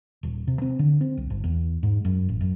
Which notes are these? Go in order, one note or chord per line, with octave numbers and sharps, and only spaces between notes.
D#1
C3
C4
D3
C4
C2
G1
E2
G#2
F#2
A1
F#2